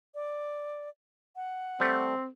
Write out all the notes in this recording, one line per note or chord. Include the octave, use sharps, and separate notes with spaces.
D5
F#5
G3 A3 C4